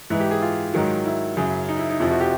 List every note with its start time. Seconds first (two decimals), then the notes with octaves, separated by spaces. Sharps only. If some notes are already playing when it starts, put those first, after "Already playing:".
0.10 G#2 E3 E4
0.20 G4
0.31 G#4
0.42 F4
0.74 G#2 D#3 F#3
1.06 E4
1.37 F#2 C#3 F#3
1.69 D#4
1.79 E4
1.90 D#4
2.00 F2 C3 F3 E4
2.11 F#4
2.20 G4